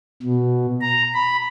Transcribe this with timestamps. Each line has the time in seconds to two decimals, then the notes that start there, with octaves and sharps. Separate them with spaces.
0.22 B2
0.81 A#5
1.14 B5